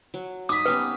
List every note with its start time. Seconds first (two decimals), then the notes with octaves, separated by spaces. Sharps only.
0.14 F#3
0.49 D#4 B5 D6 D#6
0.66 B3 C#4 G4 B4